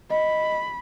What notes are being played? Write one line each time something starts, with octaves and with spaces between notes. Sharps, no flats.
D#5 B5